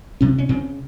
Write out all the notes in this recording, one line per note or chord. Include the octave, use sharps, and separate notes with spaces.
C3 C#4
C#4
C#3 C4